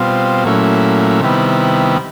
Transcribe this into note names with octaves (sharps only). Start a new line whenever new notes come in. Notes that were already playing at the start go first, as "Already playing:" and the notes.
Already playing: B2 G3 C4 F4
A#2 F#3 A3 C#4 E4
C3 D#3 G3 B3 E4